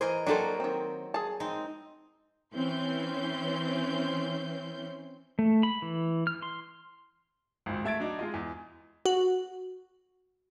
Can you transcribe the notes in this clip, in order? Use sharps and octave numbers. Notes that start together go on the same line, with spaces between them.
E3 G#4 A#4 C5 D#5
F#3 A#3 D4 G4 A4 C5
D#3 C4
G#4 A5
G#3 C4 D#4
E3 C4 C#4 C6 G6
A3
B5
E3
F6
C6
G#1 C#2
A3 E5 G#6 A6 D7
F#3 D4 D#4
G#3 F4 D#5
E2
F#4